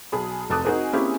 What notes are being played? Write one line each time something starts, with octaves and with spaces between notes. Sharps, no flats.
B1 G#4 B5
F1 A4 A5 D6 D#6 F#6
C4 D#4 F#4 G#4 A#4 C5
A#3 C4 C#4 E4 G4 G#4